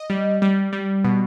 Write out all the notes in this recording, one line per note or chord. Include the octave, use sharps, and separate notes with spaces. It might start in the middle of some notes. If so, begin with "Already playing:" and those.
Already playing: D#5
G3
G3
G3
B2